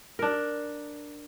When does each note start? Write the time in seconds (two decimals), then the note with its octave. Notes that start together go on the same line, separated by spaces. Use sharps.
0.19 D4 A#4